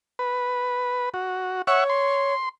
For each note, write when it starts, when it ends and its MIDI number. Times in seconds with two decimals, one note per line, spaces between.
0.19 1.09 71
1.14 1.62 66
1.67 2.34 73
1.67 1.84 76
1.67 1.84 78
1.67 1.84 85
1.90 2.49 84